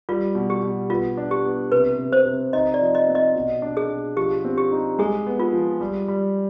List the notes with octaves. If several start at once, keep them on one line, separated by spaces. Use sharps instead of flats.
G3 F4
B2
G4
B2
B3 F4
D4
G4
B3
C3 B4
C3
C5
C3
D#4 D#5
D5
F3
D#5
C4
D#5
B2
D4
G#4
B2
F3 G4
C4
G4
D#4
G#3 G#4
B3
F4
F3
G3
G3